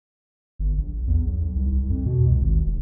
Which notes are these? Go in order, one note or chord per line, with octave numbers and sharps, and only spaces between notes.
G1
A#1
E2
B1
C2
C2
F2
B2
C#2
G#1
E1